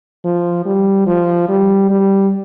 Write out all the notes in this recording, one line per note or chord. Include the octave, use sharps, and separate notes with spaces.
F3
G3
F3
G3
G3